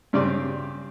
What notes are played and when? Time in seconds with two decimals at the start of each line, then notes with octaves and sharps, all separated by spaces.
0.13 G2 C#3 C4 D5 C6